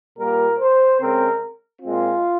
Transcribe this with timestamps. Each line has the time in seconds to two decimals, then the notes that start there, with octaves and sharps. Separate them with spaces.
0.17 A#2 G3 A#3 A#4
0.59 C5
0.99 C#3 G#3 C4 A#4
1.82 A#2 G#3 C4 F4